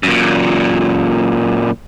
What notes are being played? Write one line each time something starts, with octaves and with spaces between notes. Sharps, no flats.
F#2 A#2